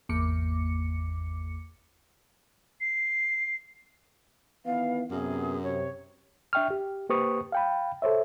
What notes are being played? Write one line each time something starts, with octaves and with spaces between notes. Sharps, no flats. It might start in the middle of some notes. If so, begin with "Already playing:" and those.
G#1 E2 A#3 D6 C#7
C7
D#3 E3 B3 F5
F#2 C3 B3 G#4
C3 C#5
D4 E5 G5 C#6 F6
G4
A#3 G4 B4 C5 C#6 D#6
F5 G5 B5
A4 C5 C#5 E5